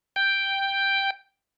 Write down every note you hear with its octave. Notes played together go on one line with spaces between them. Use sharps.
G5